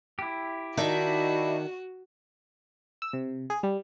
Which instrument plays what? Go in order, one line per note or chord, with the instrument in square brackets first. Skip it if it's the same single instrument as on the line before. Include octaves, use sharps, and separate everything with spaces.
[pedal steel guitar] E4 G4
[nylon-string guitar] D#3 [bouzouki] D4 D#4 E5 [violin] F#4
[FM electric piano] E6
C3
G#4
G3